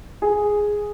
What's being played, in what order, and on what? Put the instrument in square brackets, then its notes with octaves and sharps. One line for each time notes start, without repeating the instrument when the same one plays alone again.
[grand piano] G#4